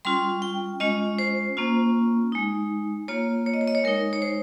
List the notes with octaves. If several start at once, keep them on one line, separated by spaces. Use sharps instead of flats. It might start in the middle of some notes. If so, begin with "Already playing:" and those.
G3 C#4 F4 C6
G5
G#3 C#4 F4 D#5
C5
A#3 C#4 F4
G#3 D#4
A#3 F4 C#5
C#5
D#5
C#5
D#5
C#5
G#3 D#4 A#4
C#5
C5